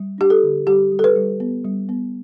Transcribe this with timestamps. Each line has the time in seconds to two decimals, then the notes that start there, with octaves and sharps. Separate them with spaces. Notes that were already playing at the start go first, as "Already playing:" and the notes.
Already playing: G3
0.18 D4 G4
0.30 A4
0.43 D3
0.67 G3 G4
0.92 G3
0.99 A4
1.04 B4
1.16 G3
1.40 B3
1.65 G3
1.89 B3